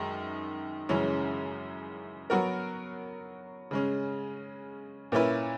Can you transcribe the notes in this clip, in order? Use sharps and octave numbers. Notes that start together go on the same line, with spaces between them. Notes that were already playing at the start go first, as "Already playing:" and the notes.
Already playing: F#2 D#3 G#3
F#2 C#3 E3 G#3 C#4
F#3 B3 F#4 A#4
C#3 G#3 C#4
A#2 A#3 C#4 E4 B4